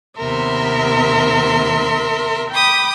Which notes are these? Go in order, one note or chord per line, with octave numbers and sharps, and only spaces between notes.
D#2 C3 B3 A#4 E5 C6
G5 B5 D6 D#6